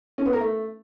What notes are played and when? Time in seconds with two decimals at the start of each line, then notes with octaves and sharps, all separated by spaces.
0.18 C#4
0.26 B3
0.33 A#4
0.40 A3